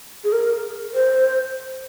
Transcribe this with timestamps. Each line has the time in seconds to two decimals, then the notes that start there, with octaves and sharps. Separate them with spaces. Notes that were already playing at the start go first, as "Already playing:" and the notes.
0.24 G#4
0.32 A#4
0.94 C5